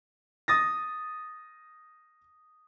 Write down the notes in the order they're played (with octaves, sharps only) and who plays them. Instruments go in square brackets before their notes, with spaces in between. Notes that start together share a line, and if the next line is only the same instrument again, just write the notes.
[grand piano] D#6 A6 A#6